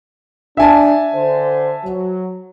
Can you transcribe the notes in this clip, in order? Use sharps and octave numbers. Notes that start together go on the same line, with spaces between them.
D4 E5 G#5 A5
D3 C5
F#3